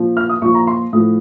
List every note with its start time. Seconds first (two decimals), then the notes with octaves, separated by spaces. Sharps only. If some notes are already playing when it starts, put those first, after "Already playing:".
Already playing: A#2 F3
0.17 F6
0.29 D#6
0.42 A#2 F3 C#6
0.54 A#5
0.67 C6
0.93 A2 F3 D#6